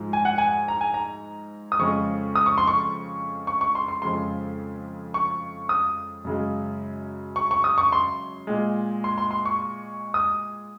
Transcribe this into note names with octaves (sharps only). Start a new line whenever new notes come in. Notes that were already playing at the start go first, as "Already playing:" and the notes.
Already playing: G#2 F3 G#3
G#5
F#5
G#5
A#5
G#5
A#5
D#6
F2 C#3 G#3 C#6
D#6
C#6
C6
C#6
C#6
C#6
C6
C6
F2 C#3 G#3 C6
C#6
D#6
F#2 C#3 G#3
C#6
C#6
D#6
C#6
C6
A#2 G#3
C6
C6
C6
C#6
D#6